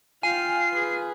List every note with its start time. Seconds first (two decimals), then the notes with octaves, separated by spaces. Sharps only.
0.23 F4 F5 G5 G#5 C7
0.72 G#4 B4